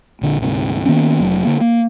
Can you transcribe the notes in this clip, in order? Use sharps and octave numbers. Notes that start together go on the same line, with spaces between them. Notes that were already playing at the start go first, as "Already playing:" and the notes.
A#1 D3
D2 G#2 C3
D#3 A#3 B3 C#4
F1 F#3
D3 A#3
A#3